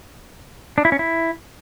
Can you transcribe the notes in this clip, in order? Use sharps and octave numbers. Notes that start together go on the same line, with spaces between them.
D4
E4
C#4
E4